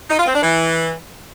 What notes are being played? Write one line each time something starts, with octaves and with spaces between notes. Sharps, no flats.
D#4
F4
C4
D4
E3